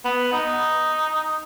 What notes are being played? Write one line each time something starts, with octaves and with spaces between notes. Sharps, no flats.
B3
D#4